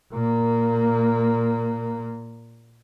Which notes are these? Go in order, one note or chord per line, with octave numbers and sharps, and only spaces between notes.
A#2 A#3